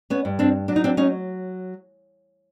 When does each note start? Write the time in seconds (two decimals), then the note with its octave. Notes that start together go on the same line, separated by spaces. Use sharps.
0.10 B3 C#4
0.25 G2
0.39 C4 D4
0.68 F#3 D4
0.76 D#4
0.84 C4 D4
0.97 C#4 D#4